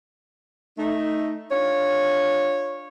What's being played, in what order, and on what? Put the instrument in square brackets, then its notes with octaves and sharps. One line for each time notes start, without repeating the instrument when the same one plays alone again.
[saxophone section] A3 D#4
D4 F4 C#5